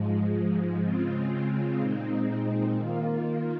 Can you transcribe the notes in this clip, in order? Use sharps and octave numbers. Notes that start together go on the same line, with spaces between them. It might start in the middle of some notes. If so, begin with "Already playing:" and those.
Already playing: G#2 F3 G#3
C#3 G#3 C4 F4
A#2 G#3 C4 D#4
D#3 A#3 F4